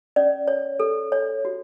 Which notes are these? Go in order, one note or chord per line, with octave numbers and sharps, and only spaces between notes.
C#4 D5
C#5
A4
C#5
F#4